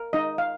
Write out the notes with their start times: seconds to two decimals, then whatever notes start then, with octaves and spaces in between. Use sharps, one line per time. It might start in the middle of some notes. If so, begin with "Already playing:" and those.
Already playing: A#4
0.13 D#4 D#5
0.38 F5